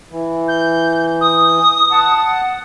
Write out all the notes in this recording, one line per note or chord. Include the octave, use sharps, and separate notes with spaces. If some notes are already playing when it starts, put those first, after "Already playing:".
E3
G6
D#6
F#5 A5